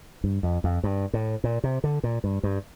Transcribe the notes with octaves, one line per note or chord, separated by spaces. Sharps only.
G2
F2
F2
G2
A2
A#2
C3
D3
A#2
G2
G2